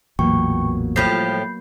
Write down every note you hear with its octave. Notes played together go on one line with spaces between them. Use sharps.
A1 E2 A#2 F#3 A#3 B3 G5 C#6
A2 F3 G3 B5 G6 C7